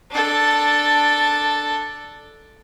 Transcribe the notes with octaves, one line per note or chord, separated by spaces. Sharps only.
D4 A4